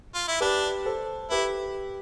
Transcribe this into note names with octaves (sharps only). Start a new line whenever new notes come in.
F4
E4
D4 G4 B4
A4 C5
E4 G4 B4